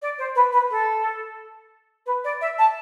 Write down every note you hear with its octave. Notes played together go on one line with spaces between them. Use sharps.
D5
C5
B4
B4
A4
B4
D5
E5
A5